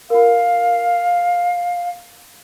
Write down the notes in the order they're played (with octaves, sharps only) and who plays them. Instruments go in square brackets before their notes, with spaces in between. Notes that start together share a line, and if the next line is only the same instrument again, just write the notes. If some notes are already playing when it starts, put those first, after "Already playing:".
[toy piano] F4 A#4 [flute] F5